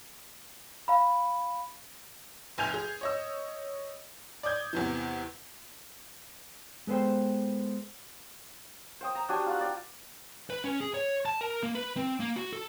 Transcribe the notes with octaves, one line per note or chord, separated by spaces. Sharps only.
F5 B5
F1 A#1 G#5 G6 F7
G#4
C#5 D#5 E6
D5 D6 D#6 G6 G#6
E2 C3 E3
G#3 B3 A4 C5 G5
C5 G5 D#6
A#5
D4 F#4 G4 G#5
F4 F#5
D5 G5
B4
C#4
G#4
C#5
A5
A#4
A#3
B4
C4
A#3
F#4
A4